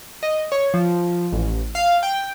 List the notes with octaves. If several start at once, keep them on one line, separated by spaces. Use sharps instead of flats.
D#5
C#5
F3
A1
F5
G5